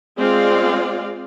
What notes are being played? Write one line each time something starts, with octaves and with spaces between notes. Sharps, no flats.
G#3 C4 F4 D5 F5